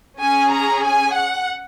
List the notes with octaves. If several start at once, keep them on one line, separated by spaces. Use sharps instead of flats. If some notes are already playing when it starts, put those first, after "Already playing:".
C#4 G#4 G#5
A#5
G#5
F#5